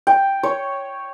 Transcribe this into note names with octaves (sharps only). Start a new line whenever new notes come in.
G5
C#5